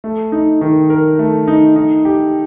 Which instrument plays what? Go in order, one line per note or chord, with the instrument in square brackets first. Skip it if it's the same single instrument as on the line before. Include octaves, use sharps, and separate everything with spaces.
[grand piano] A3
D#4
D#3
A#4
A3
D#4
D#4
G4